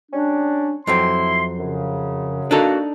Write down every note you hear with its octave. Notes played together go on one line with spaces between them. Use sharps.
G3 C#4 D4
F2 F#3 C4 E4 C6
F#2 C#3
A#3 D4 D#4 F#4 A4